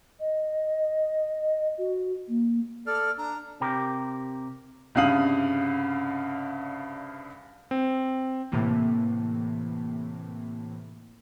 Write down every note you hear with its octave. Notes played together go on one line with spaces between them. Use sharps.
D#5
F#4
A#3
A4 D5 F6
D4 A#5
C3 G4 A#4
C2 G2 C#3 F5 D#6 F#7
C4
A2 C3 E3 A#3